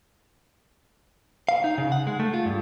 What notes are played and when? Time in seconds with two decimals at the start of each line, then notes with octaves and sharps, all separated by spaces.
1.49 F5
1.64 D#4
1.78 C#3
1.92 F#5
2.07 G#3
2.20 A3
2.34 F4
2.46 G2